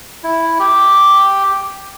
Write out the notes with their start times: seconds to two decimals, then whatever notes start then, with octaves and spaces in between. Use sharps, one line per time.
0.24 E4
0.59 G4